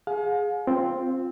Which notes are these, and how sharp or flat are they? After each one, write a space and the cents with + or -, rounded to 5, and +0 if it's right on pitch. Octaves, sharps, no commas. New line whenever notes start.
G#4 +0 F5 +40 G#5 +35
C4 +0 F4 +0